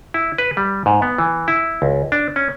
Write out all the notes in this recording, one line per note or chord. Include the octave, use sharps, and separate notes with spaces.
E4
B4
G3
G#2
B3
E3
E4
C#2
D4
C#4